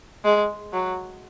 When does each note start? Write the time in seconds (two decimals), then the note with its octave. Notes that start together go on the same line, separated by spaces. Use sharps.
0.24 G#3
0.73 F#3